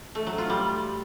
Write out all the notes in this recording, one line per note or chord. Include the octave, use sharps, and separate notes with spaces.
A3
F#3
F4
G3